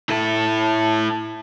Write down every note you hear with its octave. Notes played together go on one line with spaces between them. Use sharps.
E4 A4